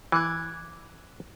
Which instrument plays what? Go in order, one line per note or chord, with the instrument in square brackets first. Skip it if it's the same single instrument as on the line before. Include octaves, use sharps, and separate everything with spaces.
[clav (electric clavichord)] E3 [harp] D6 F#6 G#6